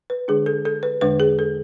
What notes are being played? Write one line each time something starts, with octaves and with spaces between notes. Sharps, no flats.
B4
D3 G#3 D4 G#4
A4
A4
B4
E2 D3 G#3 D4 B4
G#4
A4